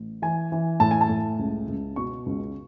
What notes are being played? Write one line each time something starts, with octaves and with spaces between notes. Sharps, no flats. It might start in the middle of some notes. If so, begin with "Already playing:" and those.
Already playing: A1
E3 G#5
E3
A2 A5
G#5
A5
A2
C#2
C#2
B2 C#6
C#2